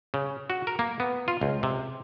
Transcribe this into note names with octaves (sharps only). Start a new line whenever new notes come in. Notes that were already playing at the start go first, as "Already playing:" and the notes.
C#3
F#4
A#4
A#3
B3
F4
C#2
C3